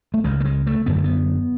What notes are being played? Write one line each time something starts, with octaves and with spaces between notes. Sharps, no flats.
A3
C#2 C#3 G#3
A3
G#3
A3
F#2 D3 B3
A3
B3